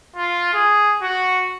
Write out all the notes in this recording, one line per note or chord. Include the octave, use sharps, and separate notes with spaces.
F4
G#4
F#4